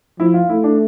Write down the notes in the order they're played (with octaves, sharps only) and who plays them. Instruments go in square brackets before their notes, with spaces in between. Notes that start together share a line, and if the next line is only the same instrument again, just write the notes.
[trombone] F3 [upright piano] E4
[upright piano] F4
[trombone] A3 [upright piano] E4
[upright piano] D4